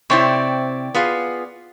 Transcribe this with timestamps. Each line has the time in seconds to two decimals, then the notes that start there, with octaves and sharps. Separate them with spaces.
0.10 C3 C4 E4 C#5 D5 G5
0.94 B3 F4 G#4